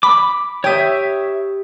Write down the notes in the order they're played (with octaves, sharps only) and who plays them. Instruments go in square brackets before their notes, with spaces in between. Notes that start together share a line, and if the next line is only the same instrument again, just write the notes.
[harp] B5 [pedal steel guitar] D6
[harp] G4 D#6 [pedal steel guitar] C#5 E5